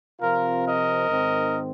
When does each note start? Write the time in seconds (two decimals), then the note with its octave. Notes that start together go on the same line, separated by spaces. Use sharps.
0.21 C3 F3 C4 F4 A#4
0.65 A#4 D#5
1.09 G#2 D#3 C4